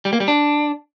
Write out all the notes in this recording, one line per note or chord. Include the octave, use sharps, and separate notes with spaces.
G3
A#3
G3
D4